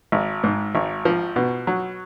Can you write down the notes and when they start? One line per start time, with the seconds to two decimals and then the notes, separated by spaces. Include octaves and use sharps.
0.12 G#1
0.44 G#2
0.75 G#1
1.05 F3
1.36 B2
1.67 F#3